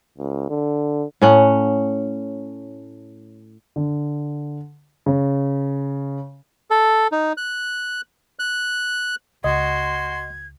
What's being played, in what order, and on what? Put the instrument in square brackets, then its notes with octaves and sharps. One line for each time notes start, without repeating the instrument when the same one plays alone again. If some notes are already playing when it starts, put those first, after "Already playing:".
[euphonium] C#2
D3
[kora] A2 C#4 F#5
[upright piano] D3
C#3
[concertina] A4
D#4
F#6
F#6
[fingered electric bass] C#2 [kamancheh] F#4 C6 [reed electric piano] D#5 [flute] G#6